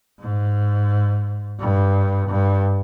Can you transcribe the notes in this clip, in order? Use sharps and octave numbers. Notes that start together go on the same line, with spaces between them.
G#2
G2
G2